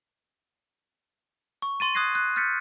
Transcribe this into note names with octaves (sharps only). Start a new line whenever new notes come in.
C#6
C6 A6 D#7
D#6 F#6 G#6 A#6 C7
F#6
F6 G6 A6 B6 C#7